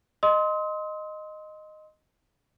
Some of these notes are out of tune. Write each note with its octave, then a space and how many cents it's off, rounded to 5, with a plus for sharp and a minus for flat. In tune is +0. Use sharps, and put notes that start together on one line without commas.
D#5 -10 C6 +0 D#6 +40